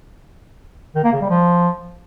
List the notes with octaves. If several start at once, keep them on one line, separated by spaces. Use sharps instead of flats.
D#3
A#3
C#3
G3
F3